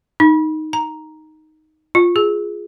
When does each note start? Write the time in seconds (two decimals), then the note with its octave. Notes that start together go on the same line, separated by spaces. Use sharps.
0.20 D#4
0.73 A#5
1.95 F4
2.16 G#4